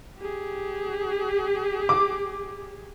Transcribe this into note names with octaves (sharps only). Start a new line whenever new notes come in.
G4 G#4
D6